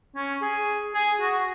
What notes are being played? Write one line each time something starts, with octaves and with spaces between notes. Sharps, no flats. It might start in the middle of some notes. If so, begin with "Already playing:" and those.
C#4
G#4
G#4
F#4